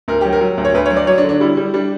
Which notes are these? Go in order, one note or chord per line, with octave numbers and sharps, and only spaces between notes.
D2 A#4
F#3 G4
A#4
F#3
D2
C#5
D2 B4
F#3 C#5
D5
F#3 C#5
D4
D3
D4
G3 E4
G3
G3 D4